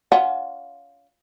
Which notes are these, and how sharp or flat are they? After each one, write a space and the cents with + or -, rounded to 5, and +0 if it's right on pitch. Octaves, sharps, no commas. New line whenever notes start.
C#4 +30 F4 +0 F#5 +0